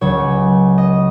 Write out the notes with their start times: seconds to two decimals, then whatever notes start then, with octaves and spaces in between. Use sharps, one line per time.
0.01 C#2 C#3 F#3 C#5
0.78 D#5